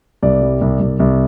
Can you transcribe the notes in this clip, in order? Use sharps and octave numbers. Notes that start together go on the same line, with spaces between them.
C2 D5
G3
C2
C2
C2